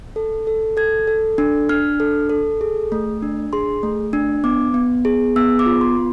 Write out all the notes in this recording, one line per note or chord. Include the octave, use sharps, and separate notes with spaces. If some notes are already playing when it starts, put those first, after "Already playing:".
A4
A4
A4 G#6
A4
D4
D4 F6
A4
A4
G#4
A3
D4
G#4 C6
A3
D4
B3 D6
B3
G#4
B3 E6
D6
F4
C6
B3